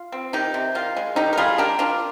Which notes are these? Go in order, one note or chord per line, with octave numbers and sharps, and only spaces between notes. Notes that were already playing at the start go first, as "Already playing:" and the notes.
Already playing: F4
C4
D#3 D#4 G4
C3
D#3 F4
G#3
D3 D#4 G4
A#4
G3 F4 G#4
D4 G4 A#4
D4 F4